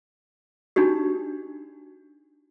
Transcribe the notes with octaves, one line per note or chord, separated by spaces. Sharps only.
D4 D#4 F#4 G4